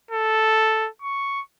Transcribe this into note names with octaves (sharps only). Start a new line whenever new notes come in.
A4
C#6